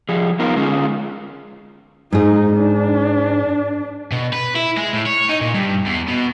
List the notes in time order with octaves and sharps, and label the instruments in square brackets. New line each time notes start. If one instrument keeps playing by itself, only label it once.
[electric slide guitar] F3 G3 G#4
B3 D#4 F4 A#4
D3 G#3 C#4 F4 G#4
[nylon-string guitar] G#2 G#4 [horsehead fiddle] D#4
[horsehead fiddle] D4
[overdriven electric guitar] B2
B4
E4
G#3
A2
C#5
D#4
A#2
G2
E2
B2